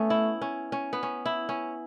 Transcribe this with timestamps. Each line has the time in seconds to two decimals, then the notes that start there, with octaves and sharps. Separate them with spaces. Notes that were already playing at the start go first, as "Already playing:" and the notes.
Already playing: A3 B3 C#4
0.10 E4
0.41 C#4
0.72 C#4
0.93 B3
1.03 C#4
1.26 E4
1.49 C#4